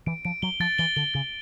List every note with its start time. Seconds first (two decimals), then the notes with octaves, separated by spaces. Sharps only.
0.06 E3 D7
0.25 F3 D7
0.42 F#3 G7
0.60 F3 A6
0.78 E3 G7
0.96 D3 G7
1.14 C#3 A6